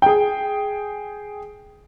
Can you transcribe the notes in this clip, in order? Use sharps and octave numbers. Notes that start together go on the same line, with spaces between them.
G#4 G5